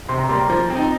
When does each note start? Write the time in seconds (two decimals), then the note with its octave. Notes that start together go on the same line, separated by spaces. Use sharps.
0.09 C3 C6
0.18 A#5
0.29 G3 A#3 C6
0.39 A#5
0.50 F3
0.70 C4
0.75 D#4